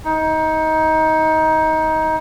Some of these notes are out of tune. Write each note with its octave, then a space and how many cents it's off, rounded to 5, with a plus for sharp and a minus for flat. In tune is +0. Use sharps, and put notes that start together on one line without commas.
D#4 +20